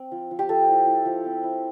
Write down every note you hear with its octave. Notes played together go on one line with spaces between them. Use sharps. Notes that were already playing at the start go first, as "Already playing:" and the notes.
Already playing: C4
F3
F3
G4
F3 A4
E4
E4
F3
C4
E4